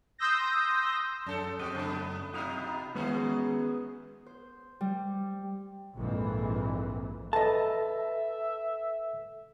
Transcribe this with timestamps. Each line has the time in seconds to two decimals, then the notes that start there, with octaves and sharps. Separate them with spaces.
0.18 C6 D#6 E6 G6 A#6
1.27 F#2 C#4 A4
1.59 F#2 C4 F#4 G4 D#5
1.75 C#3 A3 B3
2.33 B2 D#4 E4 F#4 D#5 F5
2.95 G#2 D#3 G#3 B3 C#4 F#4 G#4
4.26 C5
4.81 G3
5.96 A#1 F2 G#2 E3
7.33 A4 B4 D#5 E5 A5